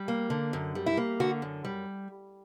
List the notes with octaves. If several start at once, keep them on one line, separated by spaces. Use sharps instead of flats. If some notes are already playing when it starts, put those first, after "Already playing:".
Already playing: G3
A#3
D3
F#2
G3
E4
A#3
D3 F#4
F#2
G3